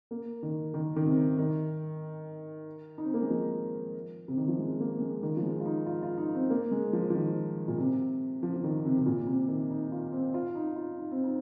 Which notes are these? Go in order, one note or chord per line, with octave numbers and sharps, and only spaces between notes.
A#3
D#3
D#3
D#3
C3
D#3
D#4
C4
A#3
G#3
F3
C3
D#3
F3
G#3
A#3
G#3
D#3
F3
G#3
F4
D#4
F4
F4
D#4
C4
A#3
G#3
F3
F3
D#3
A#2
C3
F3
F3
D#3
C3
C3
A#2
C3
D#3
D#4
F4
C4
F4
D#4
F4
D#4
C4
D#4